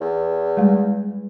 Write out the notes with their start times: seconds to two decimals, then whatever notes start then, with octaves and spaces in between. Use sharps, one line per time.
0.01 E2
0.57 G3 G#3